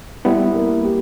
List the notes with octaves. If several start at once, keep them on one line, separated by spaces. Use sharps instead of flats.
G3 B3 E4
A#3
G4